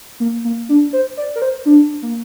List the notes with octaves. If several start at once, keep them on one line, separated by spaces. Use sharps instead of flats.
A#3
A#3
D4
C5
D5
A#4
C5
D4
A#3